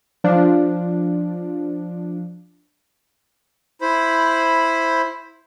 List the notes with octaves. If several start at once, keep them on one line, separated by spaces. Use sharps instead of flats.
F3 D4
E4 C5 B5